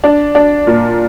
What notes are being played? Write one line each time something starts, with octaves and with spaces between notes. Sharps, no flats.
D4
D4
A#2